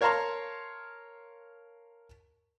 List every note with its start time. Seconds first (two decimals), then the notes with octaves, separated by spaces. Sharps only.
0.01 A#4 C#5 F5 A5 A#5 C6